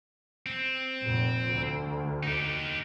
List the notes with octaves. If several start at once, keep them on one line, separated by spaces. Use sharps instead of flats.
C4
F1 A#2
D2
D#4 G4